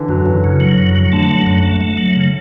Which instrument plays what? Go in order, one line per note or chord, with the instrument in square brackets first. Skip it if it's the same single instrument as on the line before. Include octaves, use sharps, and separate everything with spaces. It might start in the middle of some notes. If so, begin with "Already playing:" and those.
Already playing: [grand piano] D3 E3
[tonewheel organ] F#2 [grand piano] F#3
[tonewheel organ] F#2 [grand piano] E3
[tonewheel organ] C#3
F#3
F#2
F#3
[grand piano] D3 [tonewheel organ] A3
[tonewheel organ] F#3
F#2
A3
A3
F#3
C#3